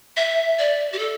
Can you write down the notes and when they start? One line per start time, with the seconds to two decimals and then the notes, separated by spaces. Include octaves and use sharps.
0.17 E5
0.59 D5
0.92 G4
0.99 A4